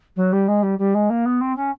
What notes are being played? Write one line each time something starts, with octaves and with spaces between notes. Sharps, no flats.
F#3
G3
G#3
G3
G3
G#3
A#3
B3
C4
C#4